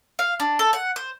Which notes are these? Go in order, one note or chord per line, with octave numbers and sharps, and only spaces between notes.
F5
D4
A4
F#5
C5